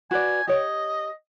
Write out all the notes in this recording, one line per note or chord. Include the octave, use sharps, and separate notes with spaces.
F#4 B4 D5 G#5
G4 C#5 D#5